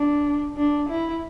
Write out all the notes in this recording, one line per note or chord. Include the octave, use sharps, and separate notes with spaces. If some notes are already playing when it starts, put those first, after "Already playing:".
Already playing: D4
D4
E4